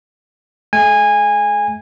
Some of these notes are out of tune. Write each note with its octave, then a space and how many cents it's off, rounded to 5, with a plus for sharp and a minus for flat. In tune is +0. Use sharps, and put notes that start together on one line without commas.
A3 -40 G#5 -20